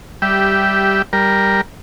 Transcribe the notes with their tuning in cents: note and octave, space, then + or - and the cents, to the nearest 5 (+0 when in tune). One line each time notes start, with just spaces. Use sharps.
G3 +0 G4 -10 E5 +0
G3 +0 A#4 +0